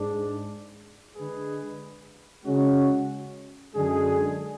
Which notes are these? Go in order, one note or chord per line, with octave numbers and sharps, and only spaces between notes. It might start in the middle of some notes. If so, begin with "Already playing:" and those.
Already playing: G#2 G#3 D4
D3 G#3 D4 G#4 B4
C#3 G#3 C#4 F#4
F#2 D3 G#3 D4 G#4